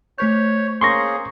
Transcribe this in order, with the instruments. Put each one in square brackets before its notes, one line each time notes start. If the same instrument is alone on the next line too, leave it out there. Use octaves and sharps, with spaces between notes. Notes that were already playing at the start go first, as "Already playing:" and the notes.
[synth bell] A3 C5 G6 [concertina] C#5
[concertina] A#3 C#4 G#4 [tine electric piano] C6 C#6 A#6